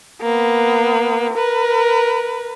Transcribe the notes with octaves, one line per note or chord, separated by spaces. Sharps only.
A#3 B3
A#4 B4